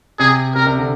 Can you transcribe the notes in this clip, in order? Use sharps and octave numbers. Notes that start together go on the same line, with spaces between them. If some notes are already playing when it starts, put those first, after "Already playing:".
C3 G#4
C3 A#4
C3
D3